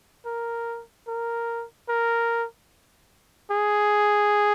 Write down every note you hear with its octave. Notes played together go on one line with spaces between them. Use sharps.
A#4
A#4
A#4
G#4